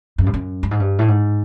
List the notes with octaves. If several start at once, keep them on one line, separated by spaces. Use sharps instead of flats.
F#2
G2
F#2
G2
G#2
G2
A2
G#2